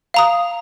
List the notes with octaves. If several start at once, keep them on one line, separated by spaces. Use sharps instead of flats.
F5 A#5 D#6